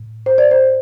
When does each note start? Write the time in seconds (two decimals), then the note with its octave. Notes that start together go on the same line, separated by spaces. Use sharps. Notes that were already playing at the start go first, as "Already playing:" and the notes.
Already playing: A2
0.26 C5
0.38 D5
0.51 C5